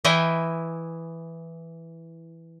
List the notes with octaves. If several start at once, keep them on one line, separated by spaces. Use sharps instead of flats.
E3 E4 D#5 G5 G#5